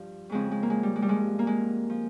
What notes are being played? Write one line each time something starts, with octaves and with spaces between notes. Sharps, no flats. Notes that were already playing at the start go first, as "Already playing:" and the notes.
Already playing: G2 F3
F2 C#3 F3 G#3 C4
G#3
A#3
G#3
G3
G#3
G3
G2 F3 G#3
A#3
G#3
F3